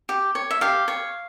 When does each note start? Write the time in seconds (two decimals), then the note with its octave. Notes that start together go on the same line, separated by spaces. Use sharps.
0.09 G4
0.35 C#5
0.51 E5
0.61 G4 F5
0.88 C#5